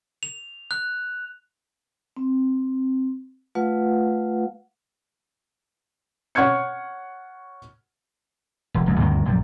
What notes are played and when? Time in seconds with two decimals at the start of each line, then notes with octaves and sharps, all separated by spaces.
0.23 F7
0.71 F#6
2.17 C4
3.55 A3 F4 B4 F5 F#5
6.35 C#5 F#5 C#6 F6 G#6 C#7
8.74 E1
8.86 F1 C#2 F#2
8.99 D2 G2 C3 D#3
9.25 A#1 F#2 G3